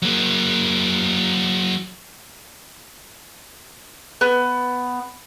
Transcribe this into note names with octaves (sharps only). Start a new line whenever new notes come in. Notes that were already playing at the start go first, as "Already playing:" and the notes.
F#3 A#3
B3